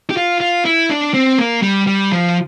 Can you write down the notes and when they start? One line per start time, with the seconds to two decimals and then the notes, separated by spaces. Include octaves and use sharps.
0.10 G4
0.17 F4
0.41 F4
0.65 E4
0.90 D4
1.14 C4
1.39 A#3
1.62 G3
1.87 G3
2.12 F3